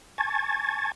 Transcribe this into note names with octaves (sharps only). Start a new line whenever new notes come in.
G#5 A5 C#6 G#6 A6